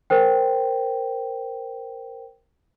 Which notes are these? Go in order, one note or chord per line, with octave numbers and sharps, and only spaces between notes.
A#4 C5 G5